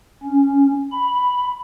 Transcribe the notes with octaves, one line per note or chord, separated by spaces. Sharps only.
C#4
B5